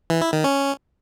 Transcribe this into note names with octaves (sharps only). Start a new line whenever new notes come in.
E3
E4
D#3
C#4